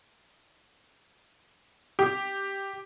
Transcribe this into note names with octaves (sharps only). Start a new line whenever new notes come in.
G4